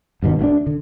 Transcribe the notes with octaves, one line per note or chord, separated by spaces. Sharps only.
G1 G2 B2 D#3
D2 A#3 D4
D3